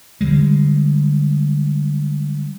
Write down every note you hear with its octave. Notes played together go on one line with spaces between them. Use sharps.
D3 G3 G#3